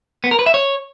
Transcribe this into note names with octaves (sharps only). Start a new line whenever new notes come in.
B3
A#4
B4
E5
C#5